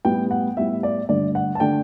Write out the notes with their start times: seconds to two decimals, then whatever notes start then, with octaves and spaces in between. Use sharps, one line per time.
0.05 A2 G3 B3 E4 G5
0.31 F#5
0.57 A2 G3 B3 E4 E5
0.83 D5
1.09 G2 D3 A3 D4 D5
1.35 F#5
1.55 A5
1.60 D3 A3 D4 G5